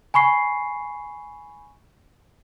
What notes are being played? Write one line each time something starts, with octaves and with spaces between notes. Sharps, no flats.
G#5 B5 C#6 C7